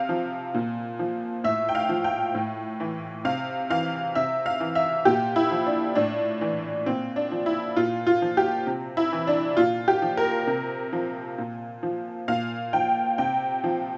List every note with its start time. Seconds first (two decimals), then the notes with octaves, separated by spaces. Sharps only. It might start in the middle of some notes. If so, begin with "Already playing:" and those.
Already playing: C3 F5
0.09 F3
0.54 A#2
0.99 F3
1.44 A2 E5
1.69 G5
1.75 F5
1.89 F3
2.04 G5
2.35 A2
2.80 E3
3.25 C3 F5
3.70 E3 F5
4.15 C3 E5
4.46 F5
4.60 E3
4.75 E5
5.05 A#2 G4
5.36 E4
5.51 F3
5.66 D4
5.95 A2 D4
6.41 E3
6.86 A#2 C4
7.16 D4
7.32 F3
7.46 E4
7.76 A#2 F4
8.07 F4
8.22 F3
8.37 G4
8.67 C3
8.97 E4
9.12 E3
9.27 D4
9.57 A#2 F4
9.88 G4
10.02 F3
10.17 A#4
10.47 C3
10.93 F3
11.38 A#2
11.83 F3
12.28 A#2 F5
12.73 F3 G5
13.18 C3 G5
13.64 F3